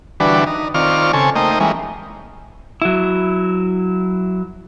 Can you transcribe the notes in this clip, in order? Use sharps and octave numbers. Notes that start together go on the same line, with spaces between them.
D3 E3 G3 D4 F#4 B4
D#4
D#3 C4 F4 D5 C#6 F6
C#3 C4 A4 G#5 C#6
A3 A#3 D#4 C5 D#5 G5
E3 G3 G#3 A#3 C#4
F#3 E4